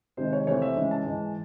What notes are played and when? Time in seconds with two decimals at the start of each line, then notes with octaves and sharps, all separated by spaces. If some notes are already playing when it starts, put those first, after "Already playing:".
0.17 C3 D#3 G#3 C4 C5
0.33 C#5
0.47 C3 E3 A3 C4 C#5
0.62 E5
0.76 C#3 E3 G#3 C#4
0.91 A5
1.05 G#2 E3 G#3